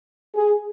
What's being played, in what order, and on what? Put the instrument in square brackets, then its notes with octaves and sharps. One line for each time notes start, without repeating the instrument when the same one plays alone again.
[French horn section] G#4